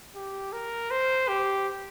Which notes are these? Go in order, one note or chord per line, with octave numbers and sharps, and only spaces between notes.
G4
A#4
C5
G4